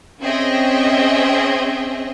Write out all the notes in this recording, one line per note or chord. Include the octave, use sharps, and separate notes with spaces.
C4 C#4 G#4 D#5 E5 G5